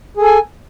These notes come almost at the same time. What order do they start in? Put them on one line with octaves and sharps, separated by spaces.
G#4 A4 G#5